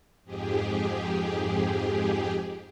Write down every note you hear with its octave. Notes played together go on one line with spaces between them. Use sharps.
F2 G#2 G4 G#4